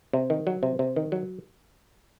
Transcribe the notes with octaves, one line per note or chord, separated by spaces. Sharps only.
C3
D#3
F#3
C3
C3
D#3
F#3